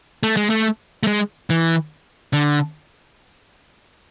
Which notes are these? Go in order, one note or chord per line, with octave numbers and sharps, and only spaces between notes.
A3
G#3
A3
A3
G#3
E3
D3